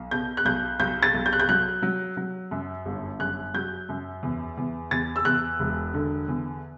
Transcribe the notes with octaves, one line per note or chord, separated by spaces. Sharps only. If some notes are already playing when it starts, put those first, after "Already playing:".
Already playing: B1
B2 G6
F#6
B1 G6
B1 G6
A6
B1
G6
F#6
G6
F#3 F#6
F#3
F#3
F#2
G1
F#2 F#6
F#3 G6
F#2
E2
E2
E2 A6
E6
E2 F#6
E1
D3
E2